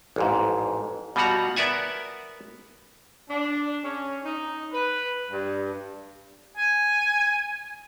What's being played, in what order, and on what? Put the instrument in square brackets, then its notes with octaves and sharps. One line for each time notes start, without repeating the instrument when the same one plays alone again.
[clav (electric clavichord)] A1 F2 G#2
B2 G3 F4 F#4 F#5 A#5
B3 A#4 D5 E5 F#5 G#5
[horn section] D4
C#4
D#4
B4
G2
[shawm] G#5